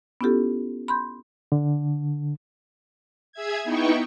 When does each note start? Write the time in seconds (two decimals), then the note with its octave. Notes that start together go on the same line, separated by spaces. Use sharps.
0.21 B3 C#4 E4 F4 G4 A4
0.88 B5 C6 G6
1.52 D3
3.32 G#4 E5 G#6
3.64 B3 D#4 E4 G5 C#6